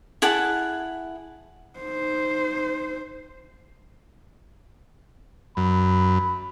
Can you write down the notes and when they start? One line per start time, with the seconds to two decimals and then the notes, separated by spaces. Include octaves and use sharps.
0.22 E4 G#4 F#5 A5
1.79 D#4 C5
5.57 F#2 B5